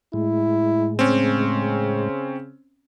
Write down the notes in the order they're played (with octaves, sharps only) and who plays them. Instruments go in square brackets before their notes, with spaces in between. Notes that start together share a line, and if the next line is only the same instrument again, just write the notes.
[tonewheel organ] A2 G#3 [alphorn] E4
[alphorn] C#3 [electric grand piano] C4 C#4